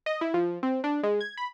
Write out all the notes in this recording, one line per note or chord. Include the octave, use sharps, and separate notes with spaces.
D#5
E4
F3
C4
D4
G#3
G#6
B5